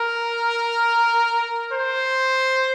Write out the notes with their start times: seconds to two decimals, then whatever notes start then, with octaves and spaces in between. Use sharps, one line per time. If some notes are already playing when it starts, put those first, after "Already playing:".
Already playing: A#4
1.72 C5